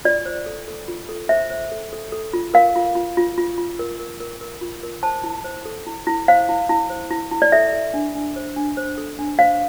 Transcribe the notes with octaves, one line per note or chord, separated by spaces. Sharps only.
F4 D5
C5
A4
A4
F4
A4
C5 E5
C5
A4
A4
A4
F4
A#4 F5
F4
F4
F4
F4
F4
A#4
A#4
A#4
A#4
F4
A#4
C5 A5
E4
C5
A4
E4
E4
C5 F5
E4
E4
C5
E4
E4
D5
A4 E5
A4
D4
D4
C5
D4
C5
A4
D4
C5 F5